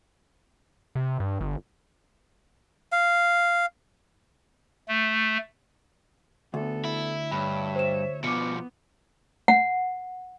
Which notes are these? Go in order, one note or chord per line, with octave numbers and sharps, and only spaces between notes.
C3
G2
G1
F5
A3
D2 B3 A4
E4
G2 C#5 E5 B5
C5 E7
B2 F3 B3 D6 C#7
F#5